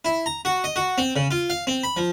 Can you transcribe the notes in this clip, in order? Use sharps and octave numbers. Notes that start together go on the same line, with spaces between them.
E4
A#5
F#4
D#5
F#4
C4
C#3
F4
F5
C4
B5
F3